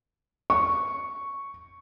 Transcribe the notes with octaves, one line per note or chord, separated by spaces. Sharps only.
C#6